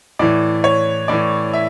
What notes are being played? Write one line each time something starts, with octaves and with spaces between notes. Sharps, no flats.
A2 E3 D5
C#5
A2 E3 D5
E5